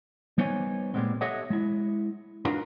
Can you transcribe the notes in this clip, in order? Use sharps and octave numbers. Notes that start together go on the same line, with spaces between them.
G3 B3 D#4 C5 C#5 G#5
A#2 G3 G#3 B3 C4
G4 A4 C#5 D#5 E5 F#5
G#3 E4
D4 D#4 F4 F#4 A#4 B4